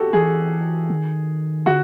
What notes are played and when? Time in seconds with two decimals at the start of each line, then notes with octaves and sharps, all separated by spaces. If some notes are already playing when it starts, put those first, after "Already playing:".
Already playing: F#4 G4 A4
0.13 E3 G#4
0.90 D#3
1.66 D3 F#4